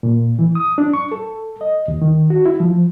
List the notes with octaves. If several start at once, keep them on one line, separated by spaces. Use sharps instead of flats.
A#2
E3
D#6
D4
C#6
A4
D#5
D#2
D#3
F#4
E4
F3